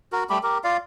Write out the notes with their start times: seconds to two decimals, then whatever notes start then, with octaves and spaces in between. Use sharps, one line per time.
0.13 F#4 A#4
0.30 G3 A3 G4 B5
0.43 G4 A#4
0.64 F4 D5 F5